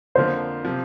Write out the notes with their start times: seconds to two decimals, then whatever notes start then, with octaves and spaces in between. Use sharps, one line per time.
0.15 F2 D3 F3 A#3 C5
0.65 C3 F3